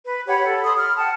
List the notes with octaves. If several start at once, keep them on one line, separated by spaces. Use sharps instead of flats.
B4
G4 C#5 F#5 B5
A4
B5 C6 D#6
F6
F#5 G5 A5